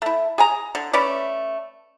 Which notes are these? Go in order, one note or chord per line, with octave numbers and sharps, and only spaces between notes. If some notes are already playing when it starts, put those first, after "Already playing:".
A3 E4
G#4 G#5 A#5
D3
A3 C#4 B4 D5